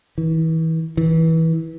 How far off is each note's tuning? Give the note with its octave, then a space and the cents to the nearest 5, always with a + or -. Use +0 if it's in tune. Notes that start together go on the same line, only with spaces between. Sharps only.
E3 -35
E3 -25